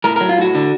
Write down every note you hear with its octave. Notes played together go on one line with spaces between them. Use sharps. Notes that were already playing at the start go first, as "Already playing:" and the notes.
A2 A#4
F#3 A#4
F4
A2 F#4
D3